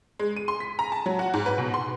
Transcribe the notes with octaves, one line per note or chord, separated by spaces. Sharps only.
G#3
D#7
C6
B6
A#5
A5
F#3
F#4
G#2
B4
B2
C6